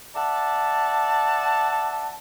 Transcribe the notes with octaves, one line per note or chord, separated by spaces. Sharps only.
D5 E5 F#5 A5